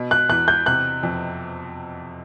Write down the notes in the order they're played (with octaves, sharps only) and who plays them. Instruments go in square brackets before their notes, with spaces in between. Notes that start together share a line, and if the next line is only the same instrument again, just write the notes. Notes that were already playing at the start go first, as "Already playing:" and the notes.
Already playing: [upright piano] B2
[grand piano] F#6
[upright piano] E2 [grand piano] F#6
[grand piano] G6
[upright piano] C3 [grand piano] F#6
[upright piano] F2